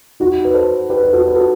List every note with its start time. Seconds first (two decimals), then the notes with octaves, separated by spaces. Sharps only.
0.20 D#4 F#4
0.45 B4
0.54 A4 C5
0.89 G4 B4
1.02 B4
1.13 F#4 A4
1.28 B4
1.36 F#4 A4